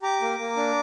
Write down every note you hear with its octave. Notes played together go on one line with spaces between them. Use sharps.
G4 A#5 D6
A#3
A#3
D4